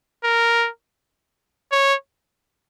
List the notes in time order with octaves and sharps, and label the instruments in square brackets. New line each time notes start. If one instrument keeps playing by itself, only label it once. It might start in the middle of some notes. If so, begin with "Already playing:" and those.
[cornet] A#4
C#5